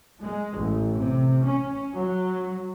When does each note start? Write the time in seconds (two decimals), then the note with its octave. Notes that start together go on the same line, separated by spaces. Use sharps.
0.20 G#3
0.58 A1
0.96 C3
1.46 C#4
1.94 F#3